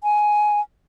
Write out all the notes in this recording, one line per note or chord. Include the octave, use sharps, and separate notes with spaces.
G#5